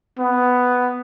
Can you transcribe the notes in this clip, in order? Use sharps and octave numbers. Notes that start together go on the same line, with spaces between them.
B3